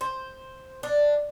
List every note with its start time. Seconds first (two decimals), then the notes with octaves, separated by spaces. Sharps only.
0.01 C5
0.83 D4